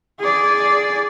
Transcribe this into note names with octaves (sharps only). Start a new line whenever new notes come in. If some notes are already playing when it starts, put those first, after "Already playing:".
G#4 D5